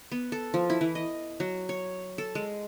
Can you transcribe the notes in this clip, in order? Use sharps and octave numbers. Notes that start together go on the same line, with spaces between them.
B3
A4
F3
E4
E3
D#5
F#3
C#5
A4
G#3